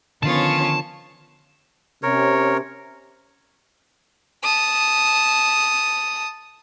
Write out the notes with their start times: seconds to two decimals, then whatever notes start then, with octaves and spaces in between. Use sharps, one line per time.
0.23 D3 D#3 F3 B3 C#4 F4 C#5 A5
2.03 C3 C#4 A#4 C#5
4.42 A5 D#6